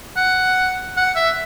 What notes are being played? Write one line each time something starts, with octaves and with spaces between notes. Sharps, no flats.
F#5
F#5
E5